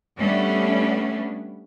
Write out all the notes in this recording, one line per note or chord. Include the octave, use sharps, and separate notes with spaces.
G3 A3 B3 C#4 D4